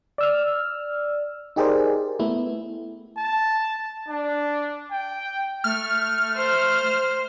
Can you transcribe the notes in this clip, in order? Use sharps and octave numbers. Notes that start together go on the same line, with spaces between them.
D5 E6 F6
D#4 G4 G#4 A#4 C5 D5
A3 B3 E4
A5
D4
G5
A3 F6
C5